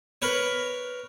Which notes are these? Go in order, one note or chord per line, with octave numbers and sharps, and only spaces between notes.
A#4 B4 C#5